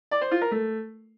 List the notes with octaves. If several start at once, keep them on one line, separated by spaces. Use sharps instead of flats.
D5
C5
F4
A#4
A3